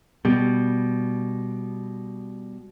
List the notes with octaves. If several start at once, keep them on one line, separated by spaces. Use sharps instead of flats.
B2 G3